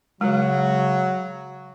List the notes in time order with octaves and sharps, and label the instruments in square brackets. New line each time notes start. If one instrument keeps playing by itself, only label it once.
[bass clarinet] C#3 [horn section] F#3 [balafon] G#3